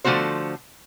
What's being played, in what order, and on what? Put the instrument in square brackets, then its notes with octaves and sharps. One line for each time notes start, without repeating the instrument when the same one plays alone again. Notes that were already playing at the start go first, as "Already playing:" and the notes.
[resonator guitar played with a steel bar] D3 F3 A3 C#4 F#4 C5